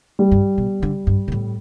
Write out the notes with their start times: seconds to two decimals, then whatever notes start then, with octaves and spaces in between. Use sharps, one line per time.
0.19 G3
0.31 G2
0.58 B2
0.83 D3
1.07 G2
1.28 B2
1.32 A2